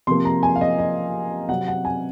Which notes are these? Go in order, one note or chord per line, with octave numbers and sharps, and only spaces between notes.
C3 F3 A#3 C6
A#5
G#5
F5
D#5
D#5
C3 F#3 C4 F#5
F#5
G#5